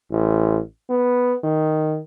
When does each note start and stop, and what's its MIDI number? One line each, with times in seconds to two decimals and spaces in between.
0.11 0.58 33
0.90 1.34 59
1.44 1.99 51